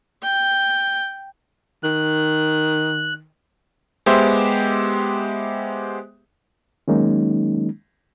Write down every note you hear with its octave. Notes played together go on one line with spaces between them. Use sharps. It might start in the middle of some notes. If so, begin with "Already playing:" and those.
G5
D#3 F#6
G#3 B3 G4 C5 E5
D#3 F#3 G#3 A#3 C#4 D#4